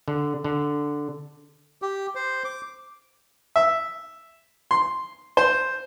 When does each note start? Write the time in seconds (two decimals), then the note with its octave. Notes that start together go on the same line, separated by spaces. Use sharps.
0.08 D3
0.44 D3
1.82 G4
2.15 C5
2.45 D6
3.56 E5
4.71 C6
5.37 C5